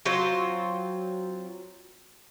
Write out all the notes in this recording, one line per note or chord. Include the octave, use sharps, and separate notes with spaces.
F#3 C4 F4 C5